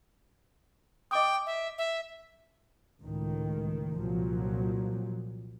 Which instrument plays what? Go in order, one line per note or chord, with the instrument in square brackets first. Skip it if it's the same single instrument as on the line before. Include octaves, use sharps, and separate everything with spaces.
[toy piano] D#5 D6 D#6 [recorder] G5
[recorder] E5
E5
[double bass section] C#2 A2 D#3
C2 A#2 F3 F#3